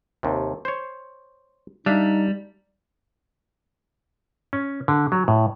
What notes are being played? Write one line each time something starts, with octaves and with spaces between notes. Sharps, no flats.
D#2 C3
C5 C#5
G3 D4 D#4 E5 F5
C#4
D3
F#3
A2